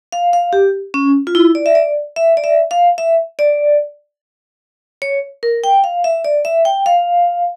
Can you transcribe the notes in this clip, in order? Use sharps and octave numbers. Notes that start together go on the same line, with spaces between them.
F5
F5
G4
C#4
F4
E4
D5
E5
D5
E5
D5
E5
F5
E5
D5
C#5
A#4
G5
F5
E5
D5
E5
G5
F5